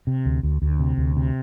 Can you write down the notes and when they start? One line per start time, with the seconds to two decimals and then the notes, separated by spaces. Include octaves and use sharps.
0.07 C3
0.26 D2
0.43 D2
0.62 D2
0.80 C3
0.97 D2
1.16 C3